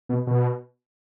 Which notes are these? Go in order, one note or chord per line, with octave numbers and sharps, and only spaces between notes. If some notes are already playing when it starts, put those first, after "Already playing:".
B2
B2